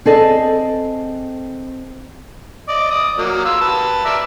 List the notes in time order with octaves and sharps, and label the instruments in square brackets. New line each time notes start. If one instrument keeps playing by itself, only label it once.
[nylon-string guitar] C4 G#4 A4 D5 D#5
[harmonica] D5 D#5
D5 D#6
F#3 A#3
F4 E6
B4 A5
A#4 D5 E5